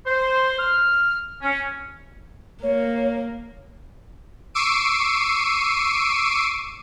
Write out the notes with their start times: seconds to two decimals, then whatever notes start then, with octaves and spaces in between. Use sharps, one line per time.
0.05 C5
0.58 F6
1.41 C#4
2.63 A#3 C#5
4.54 C#6 D6 E6 C7 D7 D#7